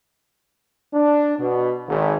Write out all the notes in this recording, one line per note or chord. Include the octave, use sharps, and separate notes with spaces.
D4
B2
G#1